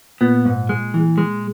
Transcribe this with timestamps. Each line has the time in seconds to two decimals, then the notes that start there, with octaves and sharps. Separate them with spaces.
0.21 A#2 B3
0.45 G#2
0.69 G#3
0.94 E3
1.18 G#3